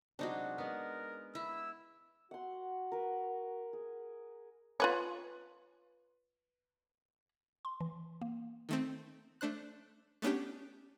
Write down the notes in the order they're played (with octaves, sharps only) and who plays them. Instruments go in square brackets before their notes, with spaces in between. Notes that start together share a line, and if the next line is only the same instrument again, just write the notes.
[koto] C3 F#3 G#3 [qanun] D4 D#4 F#4
[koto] G#3 B3 [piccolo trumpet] A#4
[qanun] E4 [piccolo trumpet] E6
[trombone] F#4 [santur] F#5 C6
[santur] A#4 B4
G#4
[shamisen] F4 B4 C#5
[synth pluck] C6
E3
A#3
D#3 A3 C4
A3 D4 C5 F#6
A3 B3 C#4 D4 G4